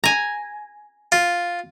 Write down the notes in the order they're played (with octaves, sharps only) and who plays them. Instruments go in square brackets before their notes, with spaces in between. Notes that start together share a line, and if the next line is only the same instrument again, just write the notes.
[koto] G#5 A#5
[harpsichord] F4